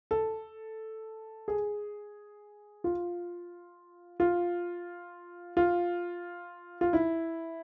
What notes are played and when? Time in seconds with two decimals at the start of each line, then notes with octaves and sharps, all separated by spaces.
0.11 A4
1.48 G#4
2.84 F4
4.20 F4
5.57 F4
6.81 F4
6.93 E4